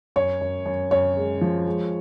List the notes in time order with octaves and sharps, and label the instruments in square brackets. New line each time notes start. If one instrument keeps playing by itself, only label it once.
[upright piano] F#2 C#5
F#2
F#2
F#2 C#5
G#3
F3
G#3